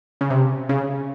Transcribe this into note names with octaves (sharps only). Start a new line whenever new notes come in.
C#3
C3
C#3